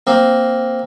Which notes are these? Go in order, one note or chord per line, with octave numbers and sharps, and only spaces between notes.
A#3 C4